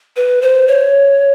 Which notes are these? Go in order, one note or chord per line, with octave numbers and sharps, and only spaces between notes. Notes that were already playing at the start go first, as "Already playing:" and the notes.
B4
C5
C#5